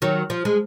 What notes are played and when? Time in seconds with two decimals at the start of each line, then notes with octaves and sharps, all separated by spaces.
0.02 D#3 F#3
0.30 F3
0.45 G#3